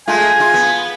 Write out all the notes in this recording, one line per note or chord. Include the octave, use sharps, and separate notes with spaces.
G#3 A3 F4 G#5
F4
B3